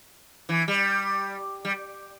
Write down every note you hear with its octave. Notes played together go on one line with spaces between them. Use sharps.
E3
G3
G3